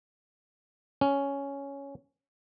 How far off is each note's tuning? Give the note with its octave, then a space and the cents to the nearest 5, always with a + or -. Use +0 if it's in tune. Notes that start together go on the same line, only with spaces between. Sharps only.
C#4 +5